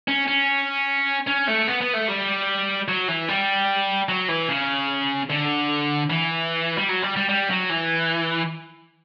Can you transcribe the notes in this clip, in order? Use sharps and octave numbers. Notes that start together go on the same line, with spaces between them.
C#4
C#4
C#4
A3
B3
B3
A3
G3
F#3
E3
G3
F#3
E3
C#3
D3
E3
G3
F#3
G3
G3
G3
F#3
E3